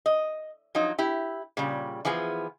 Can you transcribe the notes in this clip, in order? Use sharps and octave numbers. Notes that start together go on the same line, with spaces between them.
D#5
F3 F#3 D#4
E4 G4
A#2 C#3 G3
E3 F3 B3 G#4